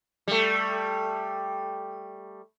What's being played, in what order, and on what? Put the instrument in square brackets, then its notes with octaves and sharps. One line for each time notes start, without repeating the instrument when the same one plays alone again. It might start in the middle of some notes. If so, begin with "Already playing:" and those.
[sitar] G3 A3